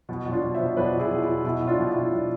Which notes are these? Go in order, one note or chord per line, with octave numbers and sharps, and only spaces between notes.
B2
B2
D4 F4
B2
C5 E5
B2
B2 B4 D5
B2
E4 G#4
B2
E4
B2
B2 E4
B2
D4 F4
B2
E4
B2
B2 D4